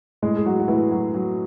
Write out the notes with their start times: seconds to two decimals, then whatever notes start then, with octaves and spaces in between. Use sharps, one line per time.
0.22 A2 G#3 G#4
0.37 G#4
0.46 F#3 F#4
0.60 F#4
0.68 A2 E3 E4
0.91 F#3 F#4
1.14 F#3